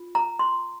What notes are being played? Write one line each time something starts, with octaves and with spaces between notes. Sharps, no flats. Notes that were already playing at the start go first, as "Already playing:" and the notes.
Already playing: F4
A#5
C6